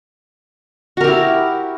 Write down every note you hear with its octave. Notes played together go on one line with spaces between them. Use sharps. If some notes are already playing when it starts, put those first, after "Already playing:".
E4 F#4 G4 A#4